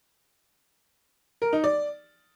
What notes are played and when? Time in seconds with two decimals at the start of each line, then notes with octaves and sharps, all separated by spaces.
1.42 A#4
1.53 D#4
1.64 D5